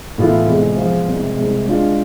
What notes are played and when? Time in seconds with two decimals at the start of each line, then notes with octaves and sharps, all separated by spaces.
0.18 A2 E3 B3 F4 A4
0.47 E2 C3 G#3
0.77 F3 B3 F4 G#4 C5
1.07 C2 C3 G#3
1.36 C2 C3 G#3
1.66 G#3 D4 F4